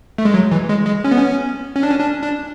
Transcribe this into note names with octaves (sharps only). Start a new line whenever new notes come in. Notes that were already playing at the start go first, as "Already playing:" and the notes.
A3
G#3
F#3
E3
G#3
G#3
C#4
B3
C#4
C#4
D4
C#4
D4
D4